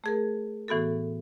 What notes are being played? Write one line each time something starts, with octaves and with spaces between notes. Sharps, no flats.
A3 G#4 A#4
A2 E3 B3 F#4 A4